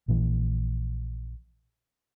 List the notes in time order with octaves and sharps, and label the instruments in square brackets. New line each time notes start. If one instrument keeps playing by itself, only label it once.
[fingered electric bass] A#1 A#2 E3